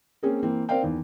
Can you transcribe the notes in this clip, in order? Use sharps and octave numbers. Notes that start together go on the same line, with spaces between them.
A#3 C4 C#4 G#4 A#4
E3 A#3 C4
C4 A#4 C5 D5 F5 G5
E2 D#3